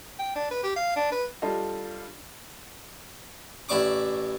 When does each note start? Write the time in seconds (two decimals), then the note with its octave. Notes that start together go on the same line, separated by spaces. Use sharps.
0.19 G5
0.36 D4
0.51 B4
0.63 G4
0.76 F5
0.96 D4
1.12 B4
1.42 G3 D4 F4 A4 D#5 F5
3.69 A1 E4 D5 C#6 D6